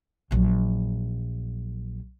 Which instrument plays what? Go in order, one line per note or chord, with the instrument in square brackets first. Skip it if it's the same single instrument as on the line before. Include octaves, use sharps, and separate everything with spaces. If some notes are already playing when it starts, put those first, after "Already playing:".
[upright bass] A#1 F#3